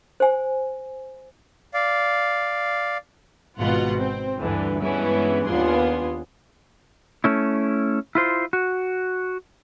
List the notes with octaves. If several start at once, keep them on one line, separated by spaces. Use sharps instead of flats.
C5 G#5
D5 F5
G#1 G#2 B2 F4 F#5
C4
D2 G2 D3 E3
G2 E3 G#3 B3 C#4 E4
D#2 B3 D4 F4 G#4 C6
A3 C#4 E4
E4 F4 C5
F#4